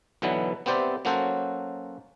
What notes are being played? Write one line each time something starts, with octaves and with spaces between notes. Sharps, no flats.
B1 B2 D3 E3 F#3 B3
B3 C4 G4 C5 D5 E5
F#3 A#3 C#4 F#4 A4 C5